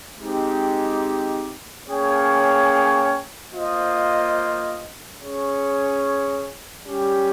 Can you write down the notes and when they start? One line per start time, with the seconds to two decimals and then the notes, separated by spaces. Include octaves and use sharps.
0.19 G#3 C4 D#4 G4
1.86 A#3 C#4 G#4 C#5 G5
3.52 A#3 F4 C5 D#5
5.18 C#4 G#4 C#5
6.85 G3 C#4 G4